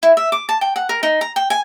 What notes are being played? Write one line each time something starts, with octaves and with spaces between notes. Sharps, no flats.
E4
E5
D6
A5
G5
F#5
A#4
D#4
A#5
G5
G#5